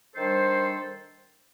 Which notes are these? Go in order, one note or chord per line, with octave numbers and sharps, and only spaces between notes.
D#3 G3 D4 A4 C5